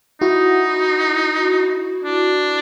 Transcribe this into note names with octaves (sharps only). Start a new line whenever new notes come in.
D#4 E4 F#4
D4